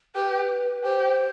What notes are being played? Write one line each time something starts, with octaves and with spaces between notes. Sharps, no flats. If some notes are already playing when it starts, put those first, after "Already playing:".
G4 B4
G4 C5